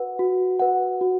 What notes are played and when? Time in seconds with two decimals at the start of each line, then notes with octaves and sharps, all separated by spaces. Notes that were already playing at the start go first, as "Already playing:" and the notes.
Already playing: F#4 B4 F#5
0.19 F#4
0.60 B4 F#5
1.01 F#4